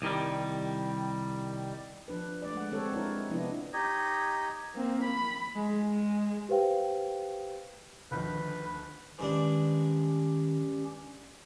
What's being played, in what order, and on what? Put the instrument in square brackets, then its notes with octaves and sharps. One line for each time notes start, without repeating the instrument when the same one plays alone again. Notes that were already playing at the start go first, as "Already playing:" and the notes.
[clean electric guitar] C2 D#3 G3
[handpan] F3 D4 B4
A3 D5
G#3 F#5
D3 G#3 C4 A4 C#5
G#3 E4 A#4 C#5
C3 F3 B3 D4 E4 D#5
[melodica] D#4 G4 C#5 D#5
[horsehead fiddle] A#3 C4
B5
G#3
G#3
[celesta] G4 B4 C5 F5 G5
[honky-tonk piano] D2 D#3 F3 [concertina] B4
[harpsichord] G2 G#3 D4 [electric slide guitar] D#3 C5 [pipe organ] C#4 G4